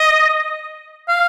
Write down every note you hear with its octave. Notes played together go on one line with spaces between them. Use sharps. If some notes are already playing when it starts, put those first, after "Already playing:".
Already playing: D#5
F5